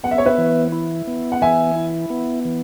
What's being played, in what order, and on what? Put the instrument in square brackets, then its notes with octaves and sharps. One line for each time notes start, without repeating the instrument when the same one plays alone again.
[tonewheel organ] B3 [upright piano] F#5
[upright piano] E5
C#5
B4 E5
[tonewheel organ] E3
E4
B3
[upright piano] F#5
[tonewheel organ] E3 [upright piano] E5 G#5
[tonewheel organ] E4
B3
E3